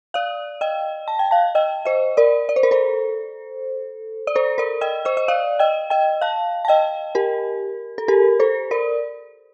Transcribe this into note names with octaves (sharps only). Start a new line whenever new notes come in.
D5 F5
D#5 G5
A5
G5
F5 A5
D#5 G5
C5 D#5
A#4 D5
D5
C5
A#4
A4 C5
D5
A4 C5
A#4 D5
D#5 G5
C5 D#5
D#5
D5 F5
D#5 G5
D#5 G5
F5 A5
A5
D#5 G5
G4 A#4
A4
G4 A#4
A4 C5
A#4 D5